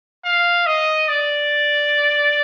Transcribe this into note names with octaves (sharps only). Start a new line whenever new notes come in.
F5
D#5
D5